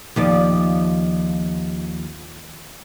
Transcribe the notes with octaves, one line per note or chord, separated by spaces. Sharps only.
D#2 F3 D5